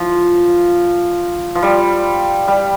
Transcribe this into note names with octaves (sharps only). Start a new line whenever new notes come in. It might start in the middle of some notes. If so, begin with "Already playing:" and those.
Already playing: F3
F3
G3
G3